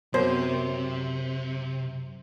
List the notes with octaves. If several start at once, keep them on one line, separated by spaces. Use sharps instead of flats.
F#2 C3 B3 A#4 C5 C#5